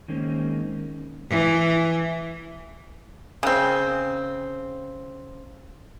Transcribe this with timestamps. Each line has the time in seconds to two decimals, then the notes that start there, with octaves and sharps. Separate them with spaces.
0.08 D#3 G#3 A#3 C4 C#4
1.29 E3
3.43 C#3 C4